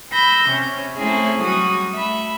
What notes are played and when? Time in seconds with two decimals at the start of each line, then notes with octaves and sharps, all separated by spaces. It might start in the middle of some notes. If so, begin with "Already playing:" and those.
0.12 B5 E6 G6 A#6
0.49 C3 C#4
0.96 A3 C4 C#4 E4 G#4
1.42 F#3 G3 F#4 D#6
1.92 A3 E5 B5